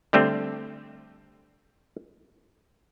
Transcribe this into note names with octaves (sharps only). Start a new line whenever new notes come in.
D3 G3 A3 C4